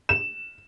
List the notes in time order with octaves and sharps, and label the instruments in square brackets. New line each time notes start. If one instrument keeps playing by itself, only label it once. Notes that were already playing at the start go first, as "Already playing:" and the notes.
[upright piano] E7